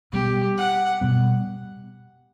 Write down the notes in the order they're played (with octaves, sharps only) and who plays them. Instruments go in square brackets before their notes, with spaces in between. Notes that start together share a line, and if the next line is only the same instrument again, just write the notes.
[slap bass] B2 G3 B3 [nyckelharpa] G4
[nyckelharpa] F#5
[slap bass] B2 G3 B3